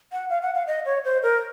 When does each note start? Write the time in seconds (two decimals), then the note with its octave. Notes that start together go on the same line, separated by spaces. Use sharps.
0.12 F#5
0.30 F5
0.42 F#5
0.55 F5
0.67 D#5
0.86 C#5
1.05 C5
1.23 A#4